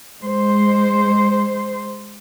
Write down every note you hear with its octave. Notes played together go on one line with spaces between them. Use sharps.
G#3 C5